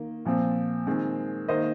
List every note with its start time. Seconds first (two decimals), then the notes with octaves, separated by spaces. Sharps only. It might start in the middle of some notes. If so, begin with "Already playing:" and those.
Already playing: D#3 A#3
0.25 A#2 F3 C4
0.87 D#3 G#3 C4
1.48 D#3 A#3 C5 D#5